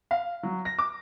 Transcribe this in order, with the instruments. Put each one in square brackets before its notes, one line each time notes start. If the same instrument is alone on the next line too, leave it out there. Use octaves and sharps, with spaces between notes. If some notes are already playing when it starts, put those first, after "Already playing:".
[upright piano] F5
F#3
A#6
D6